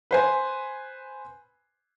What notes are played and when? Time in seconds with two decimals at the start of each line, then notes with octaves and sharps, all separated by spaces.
0.11 B4 C5 G#5